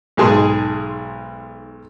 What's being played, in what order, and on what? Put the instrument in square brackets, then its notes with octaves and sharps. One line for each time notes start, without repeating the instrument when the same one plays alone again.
[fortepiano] B1 G#2 G#4 A5 C6